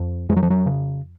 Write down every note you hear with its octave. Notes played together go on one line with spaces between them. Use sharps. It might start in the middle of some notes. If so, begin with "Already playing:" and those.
Already playing: F2
F2 G#3
F#3
F3
F#3
C#3